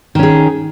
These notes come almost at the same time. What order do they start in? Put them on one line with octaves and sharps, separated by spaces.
D#3 C#4 G#4